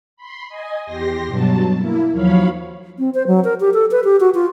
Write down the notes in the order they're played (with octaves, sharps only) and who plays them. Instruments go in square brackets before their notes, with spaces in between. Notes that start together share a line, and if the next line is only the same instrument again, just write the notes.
[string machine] B5 C6
D#5 G#5
E2 G4 C6 A#6
G2 B2 F#3 A5
A#3 E4
D#2 F3 F#3 C#5 F5 B5
[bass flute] C4
C5
F#3
A#4
G4
A4
B4
G4
F#4
F4